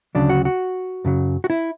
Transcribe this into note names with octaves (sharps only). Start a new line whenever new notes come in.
D2 C#3 F#3 D4
F#4
F#4
F#2 C#3 F#3
F#4
E4